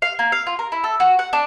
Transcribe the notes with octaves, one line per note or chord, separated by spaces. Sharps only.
F5
A#3
F5
F4
A#4
E4
A4
F#4
F#5
D4